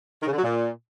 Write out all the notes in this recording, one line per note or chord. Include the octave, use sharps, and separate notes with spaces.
D#3
C#3
D3
F#3
A#2